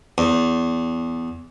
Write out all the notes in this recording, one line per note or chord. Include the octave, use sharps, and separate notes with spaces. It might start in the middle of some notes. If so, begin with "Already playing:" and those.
E2